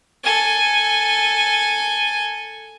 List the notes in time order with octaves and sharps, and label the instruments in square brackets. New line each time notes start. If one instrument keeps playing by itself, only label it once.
[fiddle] A4 G#5